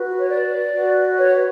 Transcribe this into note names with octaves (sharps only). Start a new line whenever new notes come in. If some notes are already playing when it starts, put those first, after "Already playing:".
Already playing: F#4 B4
C#5
D5
F#4 B4
C#5